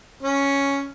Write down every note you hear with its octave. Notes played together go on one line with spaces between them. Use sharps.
C#4